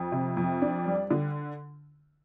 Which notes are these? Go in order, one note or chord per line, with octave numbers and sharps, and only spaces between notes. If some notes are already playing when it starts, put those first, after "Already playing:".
Already playing: F2
C3
F2
D4
G3
D3